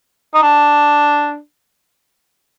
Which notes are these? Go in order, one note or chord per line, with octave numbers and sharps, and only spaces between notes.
D#4
D4